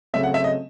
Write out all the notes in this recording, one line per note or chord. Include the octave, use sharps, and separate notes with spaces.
C#3 F#3 A3 C4 E5
F#5
E5
D#5